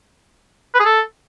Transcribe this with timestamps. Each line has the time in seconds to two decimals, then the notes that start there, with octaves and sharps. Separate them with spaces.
0.75 B4
0.80 G#4
0.85 A4